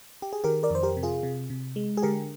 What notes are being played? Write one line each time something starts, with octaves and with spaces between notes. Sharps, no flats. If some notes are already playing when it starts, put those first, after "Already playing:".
G4
G#4
D#3 G4 A#4
A#4 D5
F2 C5
G4 A#4
C3
F4 G#4
C3
C3
G#3
G#4
D3 G4 A#4